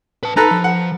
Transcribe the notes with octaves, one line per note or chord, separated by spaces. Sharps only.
B4 A5
D#4 A4 B4 A#5
F3
F#5